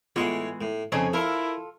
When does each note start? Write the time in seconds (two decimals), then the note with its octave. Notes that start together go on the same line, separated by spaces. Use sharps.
0.16 A2 E3 G#3 B3 F4 G#4 C#5 F#5
0.61 A2
0.92 F2 C#3 D#4 G#4 C5 C#5 A5
1.13 E4 F4 A4 A#4